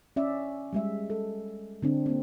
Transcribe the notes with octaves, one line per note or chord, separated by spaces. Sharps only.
C#4 D5 E5
G3 G#3 E5
A4
D3 C4 D4
A#3 C4